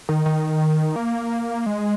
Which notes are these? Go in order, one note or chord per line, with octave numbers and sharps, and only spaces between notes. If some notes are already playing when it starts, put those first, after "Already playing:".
D#3
D#3
A#3
G#3